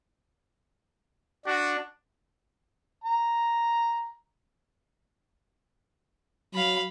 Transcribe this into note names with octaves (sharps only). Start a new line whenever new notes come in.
D4 F#4
A#5
F#3 F5 B5